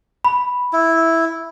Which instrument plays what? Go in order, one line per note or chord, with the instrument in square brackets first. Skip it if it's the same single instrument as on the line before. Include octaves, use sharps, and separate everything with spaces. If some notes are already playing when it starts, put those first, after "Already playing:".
[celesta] B5
[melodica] E4